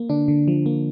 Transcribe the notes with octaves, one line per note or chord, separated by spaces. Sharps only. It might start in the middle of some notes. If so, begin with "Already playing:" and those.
Already playing: A#3
D3 D4
D3
F3
A#3